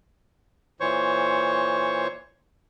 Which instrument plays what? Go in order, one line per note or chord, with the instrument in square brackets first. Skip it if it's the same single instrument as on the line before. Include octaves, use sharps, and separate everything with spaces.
[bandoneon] A#2 E3 C5 C#5 C#6